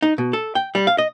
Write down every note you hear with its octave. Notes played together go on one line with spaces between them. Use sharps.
D#4
B2
A4
G5
G3
F5
D#5